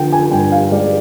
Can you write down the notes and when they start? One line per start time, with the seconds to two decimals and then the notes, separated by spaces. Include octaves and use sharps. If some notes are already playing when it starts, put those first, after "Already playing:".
Already playing: D3 F3 G5
0.13 G#5
0.31 G2 G5
0.52 F5
0.72 G#3 D5